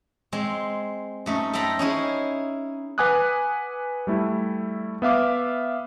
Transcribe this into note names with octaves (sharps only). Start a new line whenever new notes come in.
G#3 C4
F#2 A3 D#4
A4 C5 G5 A#5 B5
C#4 D#4 E4 G#4
B4 F#5 G#5 D6 D#6 F#6
G3 A3 E4
B3 E5 F5 D6